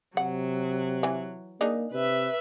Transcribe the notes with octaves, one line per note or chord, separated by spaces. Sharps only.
C3 F#3 F#5
E3 G#5
A#3 D4 D#4 G#4
C3 B4 E5